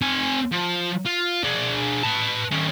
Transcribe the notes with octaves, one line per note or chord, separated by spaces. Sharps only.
C4 G#5
F3
F4
D4 G#4
B4 A5
D#3 C#4